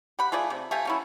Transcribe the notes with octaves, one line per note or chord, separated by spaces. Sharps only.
G4 F#5 B5
A3 F4 G#4 D5
C3
A3 G4 F5 G#5
F#3 C#4 E4